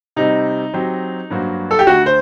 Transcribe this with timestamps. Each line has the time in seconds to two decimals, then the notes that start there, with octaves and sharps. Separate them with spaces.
0.16 C3 G3 C4 D#4
0.73 F#3 C4 G4 C5
1.30 G2 F#3 A#3 F#4 C5
1.71 A4
1.79 G4
1.87 D2 D3 A3 F#4
2.06 C5